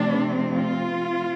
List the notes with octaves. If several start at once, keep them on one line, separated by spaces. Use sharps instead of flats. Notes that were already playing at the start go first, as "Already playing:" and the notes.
Already playing: C3 F3 A3 C4 D4
F4